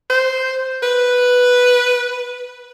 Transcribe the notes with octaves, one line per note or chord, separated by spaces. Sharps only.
C5
B4